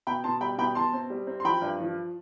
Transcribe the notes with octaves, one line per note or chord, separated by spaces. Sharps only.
B2 G5 B5
B2 A5 C6
G3 G5 B5
B2 G5 B5
B2 A5 C6
C4
G3
C4
C6
F3 G5 B5
G2
F3